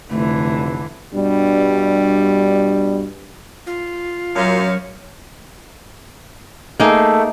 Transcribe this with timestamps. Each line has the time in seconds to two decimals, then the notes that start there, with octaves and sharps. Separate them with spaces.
0.10 F1 D3 E3 A3
1.14 G2 B2 G3 D4
3.67 F4
4.35 F#2 F#3 C#5 F5
6.80 A3 A#3 D#4 G#4